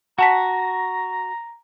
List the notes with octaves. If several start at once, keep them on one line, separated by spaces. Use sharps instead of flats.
F#4 F#5 A5 A#5 B6